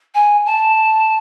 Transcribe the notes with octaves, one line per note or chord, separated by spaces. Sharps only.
G#5
A5